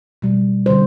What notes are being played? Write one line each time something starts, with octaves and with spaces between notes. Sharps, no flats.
B2 G3
D3 G3 C5